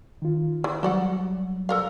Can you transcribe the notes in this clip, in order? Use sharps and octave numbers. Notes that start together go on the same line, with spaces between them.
D#3 F4
E3
F#3 G3 F#4 D5 F#5
A4 A#4 F5